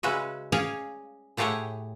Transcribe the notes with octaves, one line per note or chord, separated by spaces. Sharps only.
C#3 G#3 C#4 F#4 B4 E5
C#4 G#4 C#5 D5 F5
A2 A3 G4 G#4 C#5 F#5